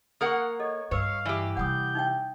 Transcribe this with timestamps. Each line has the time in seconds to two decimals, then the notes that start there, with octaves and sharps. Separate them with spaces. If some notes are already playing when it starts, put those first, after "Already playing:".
0.21 A#3 A#4 F#5 C#6 D#6
0.60 A4 C#5 D#5
0.91 G2 B4 C#5 F5 E6
1.25 E3 G4 D5
1.57 C3 G3 F#5 D#6 G6
1.95 D#4 E5 G5